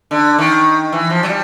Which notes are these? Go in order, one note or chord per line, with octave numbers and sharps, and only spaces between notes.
D3
D#3
E3
F3
F#3
G3